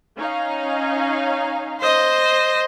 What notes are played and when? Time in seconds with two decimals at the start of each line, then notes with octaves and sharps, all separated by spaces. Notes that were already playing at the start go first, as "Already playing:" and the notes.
0.17 C#4 D#4 F5
1.81 C5 D#5